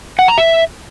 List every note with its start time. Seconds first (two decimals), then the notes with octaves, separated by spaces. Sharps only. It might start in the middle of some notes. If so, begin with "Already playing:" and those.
0.19 F#5
0.28 A#5
0.38 E5